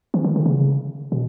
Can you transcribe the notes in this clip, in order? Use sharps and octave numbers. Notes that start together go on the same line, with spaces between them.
E3
D#3
D3
C#3
B2